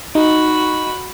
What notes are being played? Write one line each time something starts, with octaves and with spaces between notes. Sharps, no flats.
D#4 F#4 B5